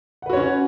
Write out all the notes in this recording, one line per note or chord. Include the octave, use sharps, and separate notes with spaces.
C#4 F#4 B4 C#5 F#5